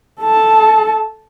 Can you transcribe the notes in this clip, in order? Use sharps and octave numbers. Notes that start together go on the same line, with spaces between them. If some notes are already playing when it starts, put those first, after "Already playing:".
A4 A5